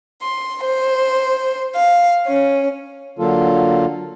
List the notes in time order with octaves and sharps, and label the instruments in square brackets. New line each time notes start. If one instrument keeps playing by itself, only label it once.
[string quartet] C6
C5
F5
C#4
[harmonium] D3 F#3 A#3 F4 A4